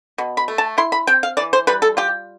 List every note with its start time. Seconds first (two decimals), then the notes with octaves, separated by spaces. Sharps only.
0.18 B2
0.37 B5
0.48 A3
0.58 A5
0.78 E4 C6
0.92 B5
1.07 C4 G5
1.23 F5
1.37 E3 D5
1.53 C5
1.67 G3 B4
1.82 A4
1.97 F4 G4